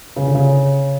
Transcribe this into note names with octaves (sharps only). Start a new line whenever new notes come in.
C#3
D3
C#3